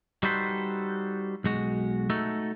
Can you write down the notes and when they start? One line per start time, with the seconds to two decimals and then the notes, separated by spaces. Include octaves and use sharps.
0.23 G3 D#4 F#4 A4 B4 C5
1.44 B1 G#3 F#4
2.10 A3 D#4 F#4 A4